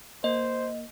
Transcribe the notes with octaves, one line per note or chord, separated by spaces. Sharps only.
A#3 C5 D#5